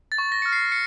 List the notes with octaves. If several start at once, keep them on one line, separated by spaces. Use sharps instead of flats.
A6
C#6
A#6
F6 C#7
C7
C#7